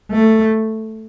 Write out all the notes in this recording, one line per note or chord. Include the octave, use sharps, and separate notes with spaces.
A3